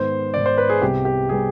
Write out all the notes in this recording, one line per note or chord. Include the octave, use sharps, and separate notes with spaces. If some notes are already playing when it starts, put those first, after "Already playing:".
Already playing: G#2 D#3 B3 C5
G#2 D#3 B3 D5
C5
B4
G#4
C2 C3 G3 B3 G4
G4
C3 G3 B3 G#4